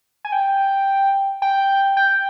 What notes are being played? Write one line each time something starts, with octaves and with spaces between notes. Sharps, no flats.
G#5
G5
G5
G5